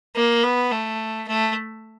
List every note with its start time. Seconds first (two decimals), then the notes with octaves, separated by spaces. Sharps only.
0.15 A#3
0.43 B3
0.72 A3
1.28 A3